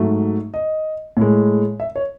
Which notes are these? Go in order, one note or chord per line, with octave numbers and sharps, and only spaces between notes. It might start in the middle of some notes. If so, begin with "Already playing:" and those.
Already playing: G#2 F#3 A3
D#5
A2 G#3
E5
C#5